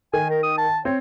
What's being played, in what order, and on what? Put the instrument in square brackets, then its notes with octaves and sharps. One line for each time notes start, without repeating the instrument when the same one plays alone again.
[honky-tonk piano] D#3 [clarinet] G#5
[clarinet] A#4
D#6
A5
[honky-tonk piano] C4 [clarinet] C#5